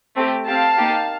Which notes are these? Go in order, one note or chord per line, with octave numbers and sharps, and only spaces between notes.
A3 C4 G4
C4 G4 F5 A5
A#3 D#4 G4